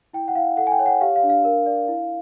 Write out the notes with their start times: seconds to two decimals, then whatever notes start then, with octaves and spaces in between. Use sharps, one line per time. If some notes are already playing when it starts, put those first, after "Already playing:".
0.13 E4 G5
0.28 F#5
0.35 E4 F5
0.57 A4 F#5
0.67 G#5
0.72 G5
0.79 C#5
0.86 F#5
1.01 G4 F5
1.16 F5
1.23 D4
1.30 F5
1.45 A#4
1.66 D5
1.88 E4